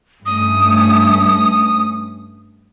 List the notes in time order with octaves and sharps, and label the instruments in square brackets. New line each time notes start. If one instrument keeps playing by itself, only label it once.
[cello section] G2 A3 C#4 [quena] D#6